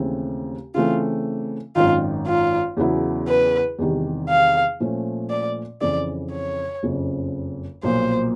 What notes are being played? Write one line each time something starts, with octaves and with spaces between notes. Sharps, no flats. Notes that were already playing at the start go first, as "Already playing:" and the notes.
Already playing: D#2 C#3 E3 A3 C4
C#3 E3 A3 C4 F4
G#1 F#2 D#3 F4
F4
E2 C#3 F#3 B3 E4
B4
E2 C3 D#3 G3
F5
A#2 F3 A3 C#4
D5
F2 C#3 E3 D5
C#5
F#1 F2 C#3 F3
B1 A#2 F3 A#3 C5